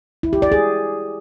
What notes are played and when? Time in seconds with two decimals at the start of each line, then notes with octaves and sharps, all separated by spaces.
0.23 E4
0.33 G4
0.42 D5
0.52 G#4